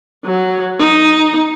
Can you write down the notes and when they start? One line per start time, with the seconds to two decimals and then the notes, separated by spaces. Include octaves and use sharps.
0.25 F#3
0.79 D#4